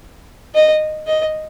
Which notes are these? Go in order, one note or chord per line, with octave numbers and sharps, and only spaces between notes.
D#5
D#5